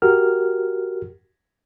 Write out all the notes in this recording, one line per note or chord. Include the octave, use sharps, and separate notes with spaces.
F#4 G4 A#4 F6